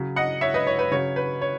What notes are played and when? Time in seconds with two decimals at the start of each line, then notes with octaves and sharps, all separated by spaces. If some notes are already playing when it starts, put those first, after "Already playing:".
Already playing: C#3 F#3
0.16 D#5 F#5
0.41 C#5 E5
0.54 B4 D#5
0.67 C#5
0.79 B4
0.91 C#3 F#3 C#5
1.16 B4
1.41 C#5